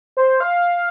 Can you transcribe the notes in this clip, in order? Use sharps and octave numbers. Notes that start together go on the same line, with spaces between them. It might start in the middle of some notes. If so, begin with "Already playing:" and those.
C5
F5